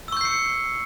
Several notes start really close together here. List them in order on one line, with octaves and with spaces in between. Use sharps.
E6 C#6 G6 C7 C#7